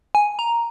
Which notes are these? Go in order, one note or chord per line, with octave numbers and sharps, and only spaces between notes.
G#5
A#5